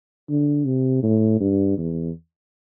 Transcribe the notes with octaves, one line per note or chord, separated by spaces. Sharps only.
D3
C3
A2
G2
E2